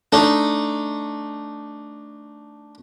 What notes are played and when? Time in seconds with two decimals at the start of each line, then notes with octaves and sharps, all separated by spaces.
0.12 A3 D4 D#4 A4